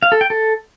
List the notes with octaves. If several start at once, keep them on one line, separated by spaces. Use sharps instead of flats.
F5
A4
G5
A4